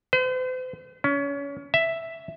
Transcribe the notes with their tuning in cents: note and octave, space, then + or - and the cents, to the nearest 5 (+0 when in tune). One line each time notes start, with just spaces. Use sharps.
C5 -45
C#4 +30
E5 +5